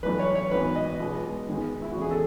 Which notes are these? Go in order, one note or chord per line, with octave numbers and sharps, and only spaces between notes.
B1 A2 E3 B4
C#5
C#5
G#1 G#2 E3 B3 B4
D#5
C#2 B2 G#3
G#2 D#3 G#3 B3
E4
F#4
E2 C#3 E3 B3 G#4
A4